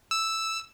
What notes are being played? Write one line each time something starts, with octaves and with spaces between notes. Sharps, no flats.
E6